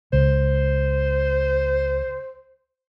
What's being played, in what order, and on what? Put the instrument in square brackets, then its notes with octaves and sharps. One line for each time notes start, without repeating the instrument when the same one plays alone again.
[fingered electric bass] C#2 [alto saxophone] C5